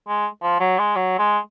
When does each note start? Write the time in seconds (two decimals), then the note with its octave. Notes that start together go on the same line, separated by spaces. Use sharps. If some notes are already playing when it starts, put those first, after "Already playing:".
0.08 G#3
0.43 F3
0.60 F#3
0.79 G#3
0.96 F#3
1.19 G#3